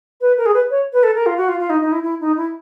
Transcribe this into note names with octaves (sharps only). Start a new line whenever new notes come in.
B4
A#4
G#4
B4
C#5
B4
A4
A#4
F4
F#4
F4
F4
D#4
D#4
E4
E4
D#4
E4